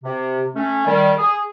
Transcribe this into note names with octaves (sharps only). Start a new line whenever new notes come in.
C3
A3 C#4
D#3 G3
G#4